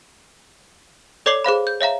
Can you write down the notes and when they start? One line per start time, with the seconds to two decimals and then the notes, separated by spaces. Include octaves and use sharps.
1.26 A4 C#5 D5 D6 C7 F#7
1.44 G#4 C5 F5 B5
1.67 G6
1.81 C#5 E5 F5 A#5